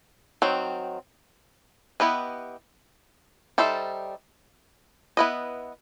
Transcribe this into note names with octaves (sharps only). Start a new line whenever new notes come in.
D#3 F#3 C4
B3 E4 G4 B4 D#5
G3 D#4 A4 C5 E5
B3 E4 B4 D#5